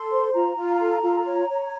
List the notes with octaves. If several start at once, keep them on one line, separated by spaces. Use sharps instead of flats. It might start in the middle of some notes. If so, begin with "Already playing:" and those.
Already playing: A4 C6
C5
F4 A#5
F4
A4
F4
C#5
C#5